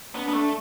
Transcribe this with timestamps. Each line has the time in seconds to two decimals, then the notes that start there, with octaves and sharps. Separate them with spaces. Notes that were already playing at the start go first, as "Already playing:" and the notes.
0.15 B3 D4
0.29 B3
0.33 A3